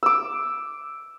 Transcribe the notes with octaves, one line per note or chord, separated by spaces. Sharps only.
D6 E6